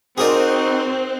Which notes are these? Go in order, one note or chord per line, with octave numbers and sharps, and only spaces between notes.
C4 D#4 F#4 G#4 A#4 C5 D5